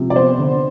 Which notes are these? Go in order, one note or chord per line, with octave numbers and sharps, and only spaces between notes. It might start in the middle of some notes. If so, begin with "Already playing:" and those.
Already playing: C3 F3
D5
B3 C5
D3